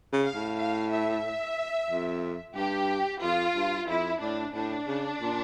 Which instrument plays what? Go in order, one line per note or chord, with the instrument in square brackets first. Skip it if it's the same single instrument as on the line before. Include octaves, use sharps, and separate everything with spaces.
[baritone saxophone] C#3
[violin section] F5
[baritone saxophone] A2
[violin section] F5
E5
[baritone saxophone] F2
[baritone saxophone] G2 [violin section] G4
[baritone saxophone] F2 [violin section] F4
[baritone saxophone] G2
[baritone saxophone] F2 [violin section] E4
[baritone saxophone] A2 [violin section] D4
[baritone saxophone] A2 [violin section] D4
[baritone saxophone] C#3
A#2